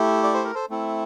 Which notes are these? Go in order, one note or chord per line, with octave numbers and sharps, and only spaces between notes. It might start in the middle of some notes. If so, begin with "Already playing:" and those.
Already playing: A3 E4 G4
D5
C5
A#4
A4 C5
A3 C4 E4